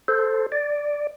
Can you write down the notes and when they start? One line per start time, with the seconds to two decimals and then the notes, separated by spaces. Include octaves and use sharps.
0.08 A4 C5
0.52 D5